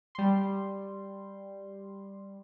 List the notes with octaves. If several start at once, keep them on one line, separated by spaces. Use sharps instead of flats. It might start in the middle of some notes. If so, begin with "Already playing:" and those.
G3 C6